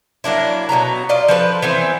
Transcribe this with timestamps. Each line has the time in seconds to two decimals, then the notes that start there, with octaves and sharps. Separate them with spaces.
0.24 F#3 A#3 D4 E4
0.69 B2 F#3 B3 A#5
1.09 F4 D5 D#5
1.28 F3 A4 B4
1.62 E3 B3 C4